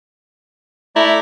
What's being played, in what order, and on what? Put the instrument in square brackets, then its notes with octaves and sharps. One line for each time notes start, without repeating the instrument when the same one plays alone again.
[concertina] A3 D5 A#5 [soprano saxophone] E4